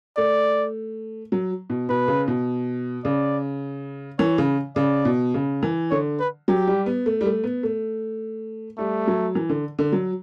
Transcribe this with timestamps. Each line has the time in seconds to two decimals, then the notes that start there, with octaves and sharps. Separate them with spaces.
0.17 A3 D5
1.32 F#3
1.70 B2
1.89 B2 B4
2.08 C#3
2.28 B2
3.04 C#3 D5
4.19 E3 C#5
4.38 C#3
4.76 C#3 D5
5.05 B2
5.34 C#3
5.63 E3
5.91 D3 C#5
6.20 B4
6.48 F#3 G4
6.68 G3
6.86 B3
7.06 A3
7.21 G3
7.26 A3
7.44 B3
7.63 A3
8.78 G3 A3
9.07 F#3
9.35 E3
9.49 D3
9.79 D3
9.92 F#3